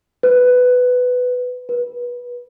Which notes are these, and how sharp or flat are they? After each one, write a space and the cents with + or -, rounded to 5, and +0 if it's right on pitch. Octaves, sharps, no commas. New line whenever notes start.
B4 +10
B4 -25